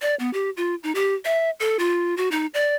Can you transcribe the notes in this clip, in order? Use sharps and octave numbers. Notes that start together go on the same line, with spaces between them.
D5
B3
G4
F4
D#4
G4
E5
A4
F4
F#4
D#4
D5